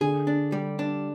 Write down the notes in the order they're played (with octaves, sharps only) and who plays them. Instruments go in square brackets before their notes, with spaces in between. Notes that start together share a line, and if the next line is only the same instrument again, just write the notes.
[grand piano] D3 [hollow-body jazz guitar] G#4
[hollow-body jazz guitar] D4
G3
D4